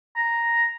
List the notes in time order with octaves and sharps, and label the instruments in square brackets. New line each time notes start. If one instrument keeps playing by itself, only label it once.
[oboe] A#5